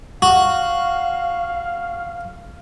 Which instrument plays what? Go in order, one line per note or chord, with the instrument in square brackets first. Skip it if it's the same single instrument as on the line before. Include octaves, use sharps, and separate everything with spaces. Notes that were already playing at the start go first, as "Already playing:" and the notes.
[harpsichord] F#4 [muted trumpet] F5